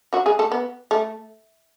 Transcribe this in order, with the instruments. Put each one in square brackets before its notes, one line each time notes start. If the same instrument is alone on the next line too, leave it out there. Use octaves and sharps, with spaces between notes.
[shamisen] F#3 F#4
G#3 G#4
A3 A4
B3
A3